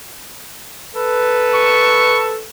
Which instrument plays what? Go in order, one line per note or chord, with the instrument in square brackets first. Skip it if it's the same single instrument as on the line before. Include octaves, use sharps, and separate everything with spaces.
[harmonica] A4 B4
[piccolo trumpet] C#6